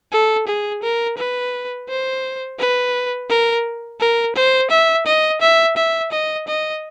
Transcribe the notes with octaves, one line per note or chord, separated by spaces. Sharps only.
A4
G#4
A#4
B4
C5
B4
A#4
A#4
C5
E5
D#5
E5
E5
D#5
D#5